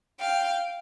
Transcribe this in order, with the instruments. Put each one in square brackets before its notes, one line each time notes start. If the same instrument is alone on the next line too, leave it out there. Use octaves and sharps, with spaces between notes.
[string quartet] F5 G5